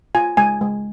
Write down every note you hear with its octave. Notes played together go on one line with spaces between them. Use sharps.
F4 G#5
G#3 G#5
G#3